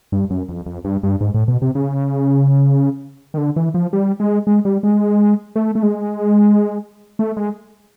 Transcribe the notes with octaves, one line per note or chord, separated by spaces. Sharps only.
G2
F#2
F2
F2
G2
G2
G#2
A2
B2
C3
C#3
D#3
D3
E3
F3
G3
G#3
G#3
G3
G#3
A3
A3
G#3
A3
G#3